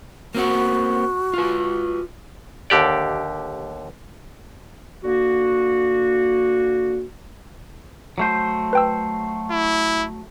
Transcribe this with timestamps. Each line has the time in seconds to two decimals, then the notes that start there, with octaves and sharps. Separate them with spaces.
0.35 A#3 C4 F#4 F#5
1.34 F4 B4
2.70 D#2 D3 G4 D5
5.03 D3 A#3 F#4
8.18 F#3 A3 C5
8.73 B4 G5 E6
9.51 E4